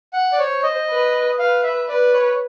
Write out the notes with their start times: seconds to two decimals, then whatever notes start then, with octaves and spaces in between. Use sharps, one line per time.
0.13 F#5
0.32 D5
0.39 C5 C#5
0.63 D#5
0.89 B4
1.39 B4 F5
1.64 E5
1.89 B4 D5
2.13 C#5